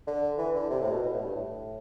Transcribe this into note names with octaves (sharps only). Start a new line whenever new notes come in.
D3
E3
D3
C3
A2
B2
B2
A2
G2
A2